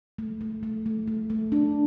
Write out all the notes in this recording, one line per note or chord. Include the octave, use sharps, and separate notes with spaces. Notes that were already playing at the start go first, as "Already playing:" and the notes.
A3
A3
A3
A3
A3
A3
D4